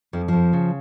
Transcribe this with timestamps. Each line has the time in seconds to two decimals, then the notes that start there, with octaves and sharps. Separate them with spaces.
0.13 F2 F3
0.28 F2 F3
0.53 C#3